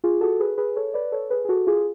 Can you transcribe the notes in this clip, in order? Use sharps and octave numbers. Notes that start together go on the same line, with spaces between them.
F4 G#4
F#4 A4
G#4 B4
G#4 B4
A4 C#5
B4 D5
A4 C#5
G#4 B4
G#4
F#4 A4
F4 G#4